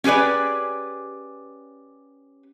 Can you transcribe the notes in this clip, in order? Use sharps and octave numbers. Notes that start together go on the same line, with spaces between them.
C#4 G4 G#4 B4 D5